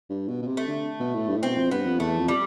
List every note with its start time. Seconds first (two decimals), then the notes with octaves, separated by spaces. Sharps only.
0.10 G2
0.28 B2
0.42 B2
0.47 C3
0.57 A3
0.67 D3
1.00 B2
1.14 A2
1.29 G2
1.36 A2
1.43 B2 C4
1.57 F2
1.71 G2 B3
1.86 F2
2.00 E2 A3
2.19 F2
2.28 G3